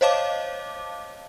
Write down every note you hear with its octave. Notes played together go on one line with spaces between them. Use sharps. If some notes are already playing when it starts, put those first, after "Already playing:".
C5 C#5 D#5 F5 A5 D6